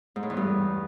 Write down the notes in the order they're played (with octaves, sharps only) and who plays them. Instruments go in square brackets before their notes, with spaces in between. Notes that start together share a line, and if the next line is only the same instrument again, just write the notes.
[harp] G#2
A2
E2
G2